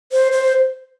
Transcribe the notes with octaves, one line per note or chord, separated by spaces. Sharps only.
C5
C5